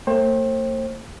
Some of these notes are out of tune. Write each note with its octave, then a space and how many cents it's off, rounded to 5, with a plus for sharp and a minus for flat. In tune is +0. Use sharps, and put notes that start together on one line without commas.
A3 +45 C5 +35 G5 +0